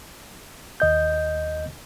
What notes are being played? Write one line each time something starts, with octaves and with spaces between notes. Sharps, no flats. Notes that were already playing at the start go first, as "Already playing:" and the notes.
D#2 D#5 G6